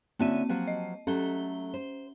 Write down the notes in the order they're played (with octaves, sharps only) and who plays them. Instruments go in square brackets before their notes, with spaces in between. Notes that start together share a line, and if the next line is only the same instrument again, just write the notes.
[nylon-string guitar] D3 C#4 E5 [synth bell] A#3 C4 D#7
[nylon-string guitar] F3 F#3 G4
[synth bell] D#5
[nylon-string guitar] F#3 A3 A4 [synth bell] C#4 G7
[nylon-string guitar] C5